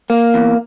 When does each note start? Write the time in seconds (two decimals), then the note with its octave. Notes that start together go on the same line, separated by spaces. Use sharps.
0.10 A#3
0.34 E2